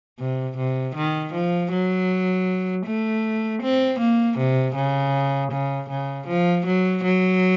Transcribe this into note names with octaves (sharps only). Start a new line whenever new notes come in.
C3
C3
D#3
F3
F#3
A3
C4
A#3
C3
C#3
C#3
C#3
F3
F#3
F#3